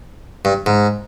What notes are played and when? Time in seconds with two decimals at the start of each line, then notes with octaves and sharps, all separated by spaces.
0.45 G2
0.66 G#2